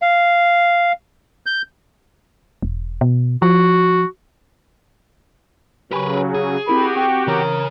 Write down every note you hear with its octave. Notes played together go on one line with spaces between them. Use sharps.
F5
G6
E1
B2
F3 F#4
C#3 F#3 G4 A#4 B4 G#5 C#6
G#4
C4 E4 F#4 G4 A#4 B5
C4 G5 C#6
C#3 E3 A#4 C#5